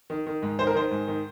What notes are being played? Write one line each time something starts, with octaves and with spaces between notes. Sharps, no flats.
D#3
D#3
G#2
D#3 C5
A#4
D#3 C5
G#2
D#3